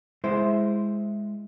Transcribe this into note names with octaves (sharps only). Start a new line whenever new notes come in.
G#3 E4 C5